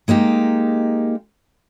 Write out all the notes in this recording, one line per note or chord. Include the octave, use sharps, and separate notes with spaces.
G#3 A#3 D#4 G4